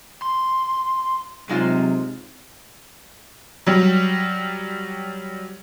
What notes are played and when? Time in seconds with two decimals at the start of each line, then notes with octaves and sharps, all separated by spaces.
0.22 C6
1.49 C3 F#3 G#3 D#4 F4
3.67 F#3 G3